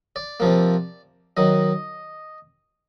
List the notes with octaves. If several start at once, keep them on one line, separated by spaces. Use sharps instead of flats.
D5
C3 F3 A#3
D#3 F#3 D#5